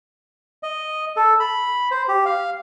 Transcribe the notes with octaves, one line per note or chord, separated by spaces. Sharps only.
D#5
A4
B5
C5
G4
F5